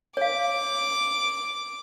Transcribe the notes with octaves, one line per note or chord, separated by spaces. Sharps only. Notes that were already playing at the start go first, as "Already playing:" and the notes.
C#5 F5 D6